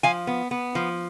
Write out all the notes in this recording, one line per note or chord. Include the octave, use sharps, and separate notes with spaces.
F3 F5 G#5
B3
B3
F3